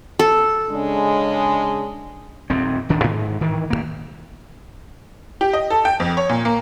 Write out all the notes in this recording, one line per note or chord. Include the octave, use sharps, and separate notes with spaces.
A4
C#3 G#3 D4
D#1 F2 C4
D1 D#3 D4
G#2
D#3 E3
D#1 F#2 A#3
G4
D#5
A4
G5
F2
C#5
A#2
A#3